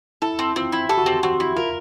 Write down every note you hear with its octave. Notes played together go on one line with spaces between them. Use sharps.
E4 A4
C4
C4 F4
E4
G4 A4
F#4
C4 G4
C4 F#4
E4
F4 A#4